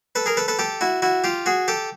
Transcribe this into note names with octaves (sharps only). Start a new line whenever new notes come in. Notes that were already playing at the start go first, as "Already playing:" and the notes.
A4 B4
G#4 A#4
A4 B4
A4 B4
G4 A4
E4 F#4
E4 F#4
F4 G4
F#4 G#4
G4 A4